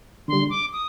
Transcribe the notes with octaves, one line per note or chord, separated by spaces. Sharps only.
D3 G3 C6
D6
D#6